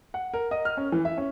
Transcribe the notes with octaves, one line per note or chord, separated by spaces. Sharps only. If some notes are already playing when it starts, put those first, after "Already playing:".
F#5
A#4
D#5
F6
C#4
E3
E5
C#4